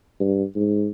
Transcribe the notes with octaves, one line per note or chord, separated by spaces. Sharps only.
G2
G#2